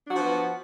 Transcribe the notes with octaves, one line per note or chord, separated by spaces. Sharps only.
F3 B3 D4 F#4